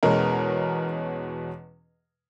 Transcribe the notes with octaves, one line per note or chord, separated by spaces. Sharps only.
E2 B2 G#3 C#4 A#4